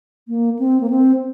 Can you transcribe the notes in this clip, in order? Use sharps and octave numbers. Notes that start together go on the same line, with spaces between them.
A#3
C4
A#3
C4